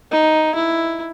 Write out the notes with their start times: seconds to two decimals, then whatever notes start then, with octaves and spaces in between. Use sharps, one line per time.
0.11 D#4
0.55 E4